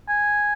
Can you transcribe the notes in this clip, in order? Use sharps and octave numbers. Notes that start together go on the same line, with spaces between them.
G#5